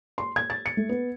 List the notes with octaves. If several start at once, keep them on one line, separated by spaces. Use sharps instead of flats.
C6
G#6
A6
C#7
A3
B3